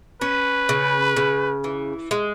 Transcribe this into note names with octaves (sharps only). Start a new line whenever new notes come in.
C#4 B4
C#3
C#3
E3
G#3